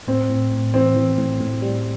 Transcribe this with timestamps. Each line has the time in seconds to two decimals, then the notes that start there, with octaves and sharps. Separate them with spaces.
0.07 A2 C4
0.29 A2
0.52 A2
0.74 E3 C4
0.96 E3
1.18 A2
1.41 A2
1.62 G3